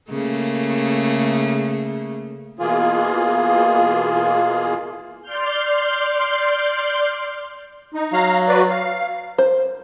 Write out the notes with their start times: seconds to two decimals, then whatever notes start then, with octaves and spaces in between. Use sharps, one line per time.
0.10 C#3 A3 A#3
2.59 B2 E3 A#3 F4 G#4
5.22 D5 C6 F6 G6
7.94 D#4
8.13 F#3 F5 A#5
8.48 F#4 B4 D5
8.70 F5
9.38 C5